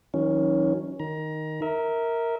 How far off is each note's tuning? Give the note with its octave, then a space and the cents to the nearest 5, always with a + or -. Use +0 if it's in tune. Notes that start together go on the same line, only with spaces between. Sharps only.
D#3 +40 F#3 +0 C#4 +0
D#3 +0 A#5 +25
A#4 -5 E5 -30